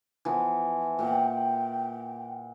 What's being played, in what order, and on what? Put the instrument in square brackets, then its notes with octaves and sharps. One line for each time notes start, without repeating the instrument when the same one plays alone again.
[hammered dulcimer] E3 F3 B3
[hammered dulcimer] A#2 F#5 [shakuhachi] G5